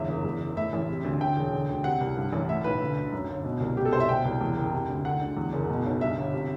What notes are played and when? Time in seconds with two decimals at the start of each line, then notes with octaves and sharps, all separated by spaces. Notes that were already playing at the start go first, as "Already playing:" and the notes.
Already playing: G1 E2 E5
0.08 F#1
0.25 E2
0.41 F#1
0.56 A2 E5
0.73 A1
0.89 C3
1.04 D2
1.20 D2 G5
1.37 E1
1.53 D3
1.69 D2
1.84 C3 F#5
2.01 C2
2.17 G2
2.33 A1
2.49 A2 E5
2.64 B1 B4
2.81 D3
2.96 D2
3.12 F#2
3.29 G1
3.44 B2
3.60 C2
3.77 B2 G4
3.85 A4
3.93 C2 C5
4.00 E5
4.09 B2 G5
4.25 C2
4.41 E2
4.56 F#1
4.73 C3
4.89 D2
5.05 D3 F#5
5.21 D2
5.37 E2
5.53 F#1
5.69 B2
5.85 B1
6.01 G2 E5
6.17 G1
6.33 C3